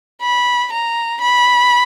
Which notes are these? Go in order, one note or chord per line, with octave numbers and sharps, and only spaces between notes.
B5
A#5
B5